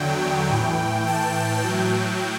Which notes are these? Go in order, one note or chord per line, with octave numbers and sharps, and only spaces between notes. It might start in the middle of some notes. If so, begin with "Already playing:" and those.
Already playing: E2 D3 F#3 G5
A2 E3
A5
G5
A2 F#3